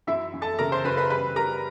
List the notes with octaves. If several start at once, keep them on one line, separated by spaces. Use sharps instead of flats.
F#2 E4 E5
F#2
A4 A5
C#3 A#4 A#5
C5 C6
F#2 B4 B5
B4 B5
G3 B4 B5
G3 A#4 A#5